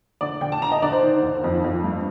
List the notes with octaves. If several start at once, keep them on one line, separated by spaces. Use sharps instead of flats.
D3 D5
D3 G5
A5
D3 A#5
D#5
D3 D5
C5
D#3
D#2
F2
F2
G2